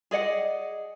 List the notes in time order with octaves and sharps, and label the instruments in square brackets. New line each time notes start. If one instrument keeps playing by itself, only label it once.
[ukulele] G#4 D5 D#5 F#5